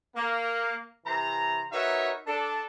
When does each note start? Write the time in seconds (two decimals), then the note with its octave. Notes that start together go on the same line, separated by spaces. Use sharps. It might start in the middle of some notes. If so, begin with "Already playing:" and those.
0.16 A#3
1.06 C3 E3 C5 A#5
1.72 D#4 F#4 A#4 B4 C#5 E5
2.27 D4 A4